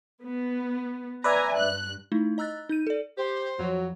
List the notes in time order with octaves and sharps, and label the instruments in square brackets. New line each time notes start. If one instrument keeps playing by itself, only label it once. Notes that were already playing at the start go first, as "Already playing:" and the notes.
[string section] B3
[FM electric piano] B4 D5 E5 [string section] G#5 A#5
[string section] G2 F#6
[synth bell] A3 D#4 E4
D#5 A#5 E6 F#6 A6
D#4 G6 D#7
A4 D5
[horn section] G4 [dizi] C5
[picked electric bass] F2 [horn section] F#3